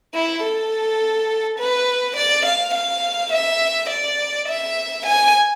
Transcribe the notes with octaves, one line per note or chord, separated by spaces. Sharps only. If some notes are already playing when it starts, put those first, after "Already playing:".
E4
A4
B4
D5
F5
F5
E5
D5
E5
G#5